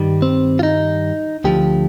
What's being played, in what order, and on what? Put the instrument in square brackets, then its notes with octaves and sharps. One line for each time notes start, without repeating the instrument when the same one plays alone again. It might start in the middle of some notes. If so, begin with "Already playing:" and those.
Already playing: [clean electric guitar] G2 D#3 G3
C4
F4
D#4
D2 D3 F3 G4